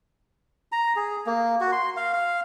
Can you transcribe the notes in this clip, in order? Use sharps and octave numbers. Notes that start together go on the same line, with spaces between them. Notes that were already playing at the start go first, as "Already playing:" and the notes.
A#5
G#4
A#3
F#4
C6
F5
F5